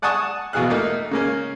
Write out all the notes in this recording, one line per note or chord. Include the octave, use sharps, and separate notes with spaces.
D5 F#5 G#5 A5 C#6 D#6
E2 B2 F#4 G#4 F5 F#6
A3 A#3 D#4
C#3 A#3 C#4